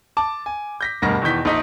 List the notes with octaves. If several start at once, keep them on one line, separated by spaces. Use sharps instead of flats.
A5 D6
G#5
G6 A#6 B6
D2 G2 B2 A#4 A#6
E2 B2 D#3 E3 G6 B6
A#1 D#4 B6